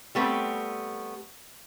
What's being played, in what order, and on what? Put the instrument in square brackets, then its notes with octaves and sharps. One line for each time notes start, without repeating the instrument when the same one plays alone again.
[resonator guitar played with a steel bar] G3 A3 B3 C4